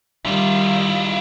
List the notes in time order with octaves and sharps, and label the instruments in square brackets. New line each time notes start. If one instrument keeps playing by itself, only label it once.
[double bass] D#3 G3 [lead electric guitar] E4 F4